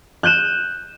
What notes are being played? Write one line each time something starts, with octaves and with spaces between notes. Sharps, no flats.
F#6 G6 D#7 E7